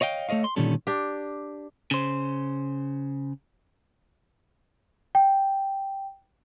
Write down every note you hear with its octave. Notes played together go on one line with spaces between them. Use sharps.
C#5 D#5 F5 G5
A3 A4 C#5 D#5 F5
C6
A#2 D3 D#3 G3 C#4 A4
D4 G4
C#3 C5
G5